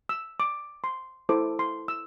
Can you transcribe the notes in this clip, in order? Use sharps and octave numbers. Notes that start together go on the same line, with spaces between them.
E6
D6
C6
E4 A4 C5 D6
C6
E6